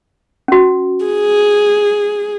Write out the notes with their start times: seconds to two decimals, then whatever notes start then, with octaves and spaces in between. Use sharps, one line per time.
0.48 C#4 F#4
1.05 G#4